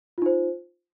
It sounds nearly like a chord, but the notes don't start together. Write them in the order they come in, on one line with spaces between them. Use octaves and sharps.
F4 D#4 C5